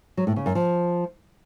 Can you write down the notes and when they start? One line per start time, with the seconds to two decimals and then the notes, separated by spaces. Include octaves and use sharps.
0.17 F#3
0.27 A2
0.36 C#3
0.46 F#2
0.55 F3